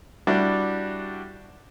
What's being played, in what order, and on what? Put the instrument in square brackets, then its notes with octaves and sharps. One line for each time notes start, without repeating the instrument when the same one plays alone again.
[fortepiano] G3 D4 E4 F#4 G4